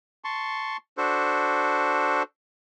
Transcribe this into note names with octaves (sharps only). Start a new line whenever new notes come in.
A5 C6 C#6
D4 F#4 A4 C5